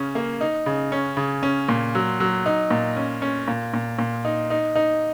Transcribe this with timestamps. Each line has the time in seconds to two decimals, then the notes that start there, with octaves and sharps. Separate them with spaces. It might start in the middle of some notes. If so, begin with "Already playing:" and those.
Already playing: C#3 C#4
0.15 A#3
0.41 D#4
0.66 C#3
0.92 C#4
1.17 C#3
1.43 C#4
1.69 A#2
1.95 F#3
2.20 F#3
2.46 D#4
2.71 A#2
2.97 C#4
3.22 C#4
3.48 A#2
3.74 A#2
3.99 A#2
4.25 D#4
4.50 D#4
4.75 D#4